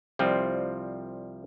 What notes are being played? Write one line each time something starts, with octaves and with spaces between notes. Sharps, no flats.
C2 F3 G3 C4 F4